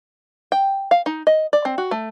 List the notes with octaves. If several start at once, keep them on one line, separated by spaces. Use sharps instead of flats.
G5
F5
D#4
D#5
D5
C4
F#4
A3